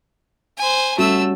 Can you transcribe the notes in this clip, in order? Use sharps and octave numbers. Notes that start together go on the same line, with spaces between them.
C5 G#5
G3 A3 C#4 F#4 E6